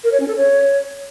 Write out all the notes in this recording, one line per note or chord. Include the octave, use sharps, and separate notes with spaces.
A#4
C#5
C#4
A4
C#5